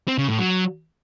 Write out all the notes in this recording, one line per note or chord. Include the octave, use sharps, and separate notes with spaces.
C4
C#3
A2
F#3